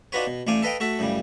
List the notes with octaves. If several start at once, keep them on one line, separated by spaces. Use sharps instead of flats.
D4 D#4 F4 F#4 B4 C#5
B2
A1 A3 D5 F5 G#5
A4 B4 D#5 F5 G5
A3 F#4 A4 E5
F#2 A2 C#3 G3